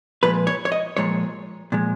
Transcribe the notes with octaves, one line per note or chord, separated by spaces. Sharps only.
A#2 F3 G#3 B4
C#5
C#5
D#5
A#2 F3 G#3 C#5
A#2 F3 G#3